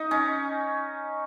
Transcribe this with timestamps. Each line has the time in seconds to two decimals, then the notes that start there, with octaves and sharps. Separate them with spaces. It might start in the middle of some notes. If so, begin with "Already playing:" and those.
Already playing: D#4
0.11 C#4